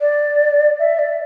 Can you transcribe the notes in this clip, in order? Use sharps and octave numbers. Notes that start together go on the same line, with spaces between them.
D5
E5
D5